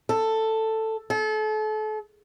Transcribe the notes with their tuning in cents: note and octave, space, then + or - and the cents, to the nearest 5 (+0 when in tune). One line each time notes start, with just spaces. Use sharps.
A4 +10
A4 -35